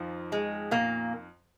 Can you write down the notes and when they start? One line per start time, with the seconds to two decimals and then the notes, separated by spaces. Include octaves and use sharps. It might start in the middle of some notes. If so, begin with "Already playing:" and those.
Already playing: F2 D#3 F3
0.32 G#3
0.71 A#2 A#3